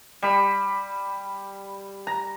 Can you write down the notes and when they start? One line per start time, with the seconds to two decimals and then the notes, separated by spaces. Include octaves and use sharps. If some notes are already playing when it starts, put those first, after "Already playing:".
0.22 G3 B5
2.07 A#5